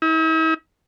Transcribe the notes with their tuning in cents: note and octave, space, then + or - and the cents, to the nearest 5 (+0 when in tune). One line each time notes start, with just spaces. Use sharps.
E4 -45